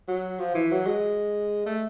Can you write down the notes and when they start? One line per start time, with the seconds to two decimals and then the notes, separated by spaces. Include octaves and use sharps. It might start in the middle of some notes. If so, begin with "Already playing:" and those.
0.08 F#3
0.39 F3
0.55 E3
0.71 F#3
0.86 G#3
1.66 A3